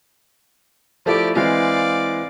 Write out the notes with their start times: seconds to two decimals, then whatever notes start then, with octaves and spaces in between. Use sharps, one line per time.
1.06 F3 A3 E4 G4 D5
1.36 E3 G#3 C4 D5 F5